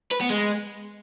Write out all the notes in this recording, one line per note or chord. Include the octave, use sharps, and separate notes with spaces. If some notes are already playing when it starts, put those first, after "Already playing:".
B4
B3
G#3